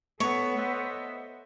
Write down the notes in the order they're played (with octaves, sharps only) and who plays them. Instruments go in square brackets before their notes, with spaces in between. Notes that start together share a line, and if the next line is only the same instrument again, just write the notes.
[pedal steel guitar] A3 [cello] B3 A4 [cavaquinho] C#5
[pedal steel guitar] C5 D#5 E5